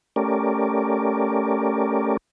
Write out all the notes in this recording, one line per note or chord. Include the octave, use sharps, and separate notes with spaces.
A3 C#4 G4 A#4 D5